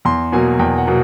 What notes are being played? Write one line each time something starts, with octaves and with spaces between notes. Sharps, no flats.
E2 C6
B2 F#3 A#3 G#5
E2 G5
F#5
B2 F#3 A#3